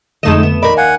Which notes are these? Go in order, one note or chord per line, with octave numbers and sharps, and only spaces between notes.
F2 D3 G#3 A3 D#4 D#5 E7
B3
D#2 A#4 D5 D#5 B5
F5 F#5 G#5